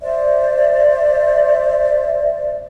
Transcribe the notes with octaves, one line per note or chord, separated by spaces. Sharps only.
C5 D5 E5